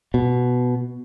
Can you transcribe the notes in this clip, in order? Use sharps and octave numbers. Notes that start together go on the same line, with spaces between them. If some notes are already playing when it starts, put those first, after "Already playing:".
B2